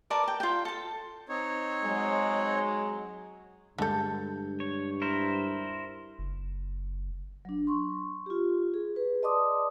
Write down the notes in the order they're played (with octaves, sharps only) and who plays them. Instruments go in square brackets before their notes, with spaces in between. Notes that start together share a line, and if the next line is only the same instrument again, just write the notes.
[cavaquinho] A#4 B4 D5 A5
G5 A5
F4 G5
A4 A5
[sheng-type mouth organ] C4 D#4 C#5
[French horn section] F#3 G#3
[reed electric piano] D2 G#3 G6 [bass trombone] G2 [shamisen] D3 A4
[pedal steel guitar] C#5
E4 A#4 C5
[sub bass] F#1
[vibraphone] F#3 D4
C6 C#6
F4 G4
G#4
G#4 B4
D5 D#5 A5 C6 D6 D#6